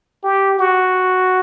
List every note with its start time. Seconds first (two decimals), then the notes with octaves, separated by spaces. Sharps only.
0.23 G4
0.59 F#4